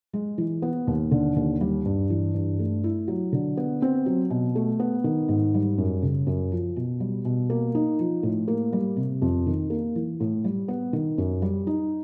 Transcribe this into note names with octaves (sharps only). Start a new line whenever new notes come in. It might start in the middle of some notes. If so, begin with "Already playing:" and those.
G#3
E3
B3
D#2
D3
D#2
G3
G2
E3
G2
A3
E4
F#3
D3
B3
C4
F#3
B2
A3
B3
D#3
G#2
G3
F#2
C#3
F#2
F3
B2
G3
B2
A#3
D#4
F3
A2
A#3
G3
C3
F2
D#3
A#3
E3
A2
G3
B3
D#3
F#2
G3
D#4